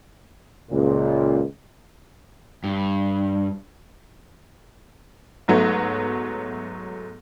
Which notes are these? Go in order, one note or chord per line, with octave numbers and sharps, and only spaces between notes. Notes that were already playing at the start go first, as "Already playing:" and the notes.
C#2 A#2
G2
G#2 F#3 A3 B3